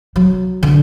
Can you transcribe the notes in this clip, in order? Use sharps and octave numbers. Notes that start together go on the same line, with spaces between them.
F#3
D3